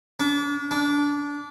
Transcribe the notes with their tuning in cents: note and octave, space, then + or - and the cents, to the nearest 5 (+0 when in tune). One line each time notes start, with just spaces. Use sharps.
D4 -35
D4 -20